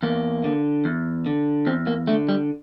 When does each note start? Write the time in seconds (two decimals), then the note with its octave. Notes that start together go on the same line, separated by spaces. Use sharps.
0.03 E2 A#3
0.44 D3
0.85 E2
1.26 D3
1.67 E2 C4
1.87 A#3
2.07 D3 A3
2.29 G3